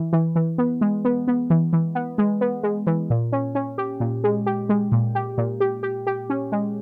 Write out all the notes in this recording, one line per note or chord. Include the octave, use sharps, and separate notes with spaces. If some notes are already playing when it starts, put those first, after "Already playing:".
Already playing: E3
E3
E3
B3
G#3
B3
B3
E3
E3
B3
G#3
B3
G#3
E3
A#2
C#4
C#4
G4
A#2
G#3
G4
G#3
A#2
G4
A#2
G4
G4
G4
C#4
G#3